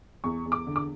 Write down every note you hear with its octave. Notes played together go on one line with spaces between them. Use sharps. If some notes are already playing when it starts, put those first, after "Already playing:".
E2 C#6
E2
D6
D3
D6